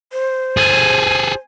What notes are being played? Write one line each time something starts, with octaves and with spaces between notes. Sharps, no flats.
C5
G#4 A4 G#5